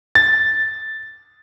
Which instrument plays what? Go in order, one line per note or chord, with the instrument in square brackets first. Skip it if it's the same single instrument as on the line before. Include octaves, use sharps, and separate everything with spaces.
[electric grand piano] A6